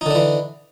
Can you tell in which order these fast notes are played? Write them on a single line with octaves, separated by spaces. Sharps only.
D#4 D3 D4 E3